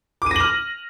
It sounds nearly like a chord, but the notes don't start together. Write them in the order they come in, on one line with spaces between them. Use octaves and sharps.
D6 D#7 A#6 F#7 F6